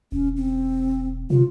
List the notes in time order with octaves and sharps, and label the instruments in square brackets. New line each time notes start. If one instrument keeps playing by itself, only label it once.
[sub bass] E1 [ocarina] C#4
[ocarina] C4
[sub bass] C3 [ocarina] F4